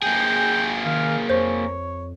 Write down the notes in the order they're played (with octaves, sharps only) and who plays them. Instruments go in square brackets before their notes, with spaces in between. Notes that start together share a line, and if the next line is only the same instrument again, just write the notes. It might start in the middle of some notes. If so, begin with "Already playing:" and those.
[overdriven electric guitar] A#3 G#4 [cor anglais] G5
[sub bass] D#3 [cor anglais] F5
[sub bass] F2 [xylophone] C5 [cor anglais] C#5